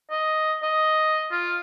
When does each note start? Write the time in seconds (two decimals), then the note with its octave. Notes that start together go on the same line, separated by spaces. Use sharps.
0.11 D#5
0.63 D#5
1.32 F4